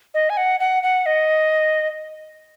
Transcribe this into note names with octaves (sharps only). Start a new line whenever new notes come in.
D#5
G#5
F#5
F#5
F#5
D#5